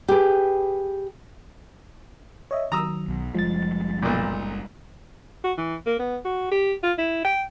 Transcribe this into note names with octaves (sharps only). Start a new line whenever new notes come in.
G4 G#4 B4
C#5 D#5 E5
D#3 F#3 A#5 D#6 E6
B1
F#1 F3 G3 G#3 A6
B1 A#2
F#4
E3
A#3
B3
F#4
G4
F4
E4
G5